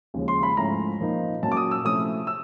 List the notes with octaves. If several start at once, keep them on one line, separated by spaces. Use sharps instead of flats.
D#2 C#3 F3 G#3
C6
B5
G#2 F3 A3 C#4 E4 A#5
A#2 F3 A#3 D#4
A#2 F#3 A#3 C#4 A5
D6
D#6
E6
C3 F3 A3 C#4 E4 D#6
E6